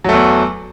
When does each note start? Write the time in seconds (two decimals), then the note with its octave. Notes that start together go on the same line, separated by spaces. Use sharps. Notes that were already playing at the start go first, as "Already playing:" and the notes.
0.04 F#3
0.09 A3
0.13 E2